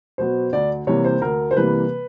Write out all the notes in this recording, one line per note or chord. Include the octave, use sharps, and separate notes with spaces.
B2 F#3 B3 C5
D2 D5
C3 E3 G3 A#3 C#5
C5
D2 A#4
C5
C3 E3 G3 A#3 B4